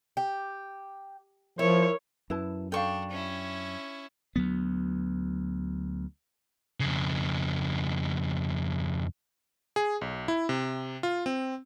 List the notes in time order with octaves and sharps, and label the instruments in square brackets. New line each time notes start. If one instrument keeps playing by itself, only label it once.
[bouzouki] G4
[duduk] F3 [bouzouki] E4 [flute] A#4 [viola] C#5
[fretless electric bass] F#2 F#3 [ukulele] E4 B4 A5
[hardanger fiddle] D4 [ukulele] A4 F5 [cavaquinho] G5 C#6
[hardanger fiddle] C#4 E4
[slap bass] D2 F#3 B3
[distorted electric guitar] F2 C#3
[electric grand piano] G#4
B1
E4
C3
F4
C4